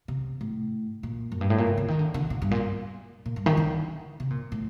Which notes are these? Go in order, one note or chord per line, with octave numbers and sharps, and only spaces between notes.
C3
A2
A#2
F#2
G2
A2
A#2
C3
D3
D#3
D3
D3
A#2
G2
A#2
A#2
G2
D#3
D3
C3
A#2
A2